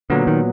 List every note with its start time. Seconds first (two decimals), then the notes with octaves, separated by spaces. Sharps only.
0.10 A#2 D3 F#3 B3
0.27 D#3